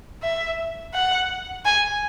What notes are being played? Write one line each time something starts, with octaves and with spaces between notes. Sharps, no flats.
E5
F#5
G#5